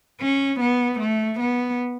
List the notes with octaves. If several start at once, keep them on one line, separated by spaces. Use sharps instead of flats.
C#4
B3
A3
B3